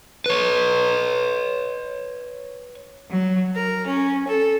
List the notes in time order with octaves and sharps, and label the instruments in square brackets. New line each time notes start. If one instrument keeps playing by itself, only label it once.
[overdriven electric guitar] B4 C#5
[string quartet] F#3
A#4
C#4
A4